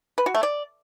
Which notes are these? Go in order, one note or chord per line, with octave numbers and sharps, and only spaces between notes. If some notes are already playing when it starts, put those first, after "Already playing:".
B4
F#4
A3
D5